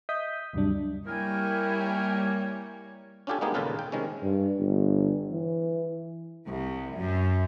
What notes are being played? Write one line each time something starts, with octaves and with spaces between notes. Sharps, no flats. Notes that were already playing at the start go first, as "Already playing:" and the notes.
D#5 E5 D#6 G6 B6
D2 G2 C3 F#3 G3 D4
G3 A#3 E4 A#4 C#5 G5 G#5
C#4 D4 F4 G4 A4 G#5
G#3 A#3 B3 D#4 G4 G#4
D#2 A#2 C#3 F4 A4 B4
G5
C3 D#3 G#3 C#4
G2
G1
E3
C2
F#2